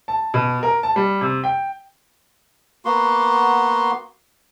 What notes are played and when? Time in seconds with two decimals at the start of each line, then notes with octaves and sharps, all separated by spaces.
0.08 A5
0.34 B2
0.63 A#4
0.83 A5
0.96 G3
1.21 C3
1.44 G5
2.85 A#3 B3 F#4 C6